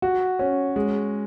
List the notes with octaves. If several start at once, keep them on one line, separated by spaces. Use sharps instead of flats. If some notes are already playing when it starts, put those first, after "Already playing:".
F#4
C#4
G#3